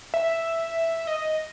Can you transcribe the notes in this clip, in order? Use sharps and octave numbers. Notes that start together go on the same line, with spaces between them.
E5
D#5